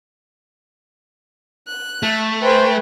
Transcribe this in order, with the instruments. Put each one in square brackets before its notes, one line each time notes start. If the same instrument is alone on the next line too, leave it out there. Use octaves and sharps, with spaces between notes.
[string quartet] F#6
[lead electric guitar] A3
[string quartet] B4 G5 G#5 [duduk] C5